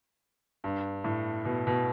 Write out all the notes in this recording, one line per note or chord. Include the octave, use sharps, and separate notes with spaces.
G2
A2
B2
B2